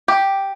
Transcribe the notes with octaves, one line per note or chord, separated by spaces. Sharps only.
G4